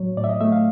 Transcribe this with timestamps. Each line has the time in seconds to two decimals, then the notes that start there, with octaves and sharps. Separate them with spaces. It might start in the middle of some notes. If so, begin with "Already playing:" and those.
Already playing: A2 F#3 C#5
0.17 A2 D5
0.24 E5
0.29 D#5
0.41 A3 E5
0.52 F5